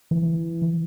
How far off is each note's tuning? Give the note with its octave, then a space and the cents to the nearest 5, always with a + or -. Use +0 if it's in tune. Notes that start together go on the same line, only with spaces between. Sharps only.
E3 +10